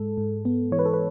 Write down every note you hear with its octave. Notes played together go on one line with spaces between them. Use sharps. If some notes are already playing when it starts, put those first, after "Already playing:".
Already playing: G#2 G#3 A4
G#2
B3
E3 C#5
B4
A4
B4